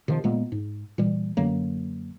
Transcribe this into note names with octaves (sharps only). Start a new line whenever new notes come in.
C3 D#3 F3
A#2 G#3 A#3 B3
G#2
A#2 E3 G3
F#2 D3 F#3 A#3